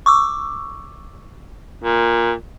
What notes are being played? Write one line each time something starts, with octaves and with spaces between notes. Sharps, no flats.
C#6 D6 E6
A#2